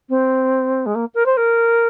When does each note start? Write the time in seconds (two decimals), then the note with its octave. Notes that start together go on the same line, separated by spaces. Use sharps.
0.09 C4
0.86 G#3
0.95 A#3
1.14 A#4
1.25 C5
1.37 A#4